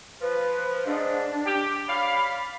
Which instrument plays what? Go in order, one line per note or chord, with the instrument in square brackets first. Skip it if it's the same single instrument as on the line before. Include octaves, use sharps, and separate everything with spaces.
[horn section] F3 [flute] B4
[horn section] G#2 [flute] D4
[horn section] G4
[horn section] C#5 D5 F5 [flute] B5